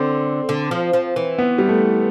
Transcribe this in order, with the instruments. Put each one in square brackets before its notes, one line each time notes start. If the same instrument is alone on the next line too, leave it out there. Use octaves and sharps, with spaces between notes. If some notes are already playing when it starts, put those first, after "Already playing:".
Already playing: [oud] D3 [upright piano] C4
[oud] D3
F3
F3
E3
[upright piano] B3
G3
A3